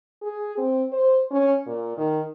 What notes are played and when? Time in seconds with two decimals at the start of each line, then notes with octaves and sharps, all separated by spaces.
0.22 G#4
0.57 C4
0.92 C5
1.31 C#4
1.66 A#2
1.97 D#3